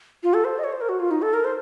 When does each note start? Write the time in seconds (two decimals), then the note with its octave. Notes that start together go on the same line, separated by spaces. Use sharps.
0.23 F4
0.34 A4
0.44 C5
0.59 D#5
0.64 C#5
0.72 C5
0.81 A#4
0.89 F#4
1.00 F4
1.11 D#4
1.22 A4
1.33 A#4
1.44 C5